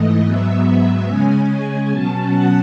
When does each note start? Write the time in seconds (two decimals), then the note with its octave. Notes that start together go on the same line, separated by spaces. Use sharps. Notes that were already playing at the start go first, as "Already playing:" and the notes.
Already playing: G#2 E3 A3 D#5
0.24 G#2 F#3 B3 E5
1.08 C#3 G#3 C#4 G#5
1.91 B2 F#3 C#4 A5
2.32 F#5